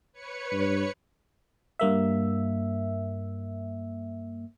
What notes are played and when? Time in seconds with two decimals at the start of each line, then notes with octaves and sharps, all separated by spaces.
0.12 B4 C#5 C#7
0.52 G2
1.79 G2 A#3 E5